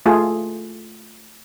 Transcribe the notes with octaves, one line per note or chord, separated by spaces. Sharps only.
A3 F4 G#4 A4